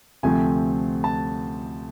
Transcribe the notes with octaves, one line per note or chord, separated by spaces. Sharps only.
D2 C3 F3 A3 C4 G#5
A5